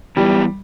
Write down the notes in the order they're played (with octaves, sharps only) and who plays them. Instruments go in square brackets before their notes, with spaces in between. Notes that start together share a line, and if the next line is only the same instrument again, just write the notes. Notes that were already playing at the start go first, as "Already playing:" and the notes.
[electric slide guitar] E3 B3 E4 G4 [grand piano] G3